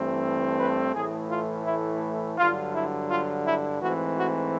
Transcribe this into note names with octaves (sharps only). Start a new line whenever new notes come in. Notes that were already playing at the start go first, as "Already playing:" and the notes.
Already playing: G2 E3 A3 C4
B4
A2 E3 A3 G#4
F4
E4
G2 D3 F#3 F4
E4
F4
E4
G#2 E3 A3 C4 F#4
F#4